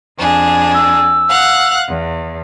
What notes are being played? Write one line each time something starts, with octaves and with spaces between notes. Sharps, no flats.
F2 D4 G#4
E6
F5 F#5 F#6
E2